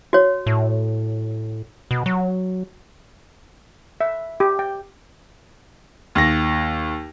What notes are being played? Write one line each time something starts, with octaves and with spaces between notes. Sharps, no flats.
F#4 C#5
A2
B2
F#3
E5
G4
G5
D#2 A#6